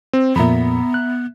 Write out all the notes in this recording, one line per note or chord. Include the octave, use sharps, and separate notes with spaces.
C4
F2 A#2 B3 E5 A#5 B5
F#6